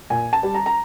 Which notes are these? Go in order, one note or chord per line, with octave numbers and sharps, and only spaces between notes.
A#2 G#5
A5
G3
A#5
A#5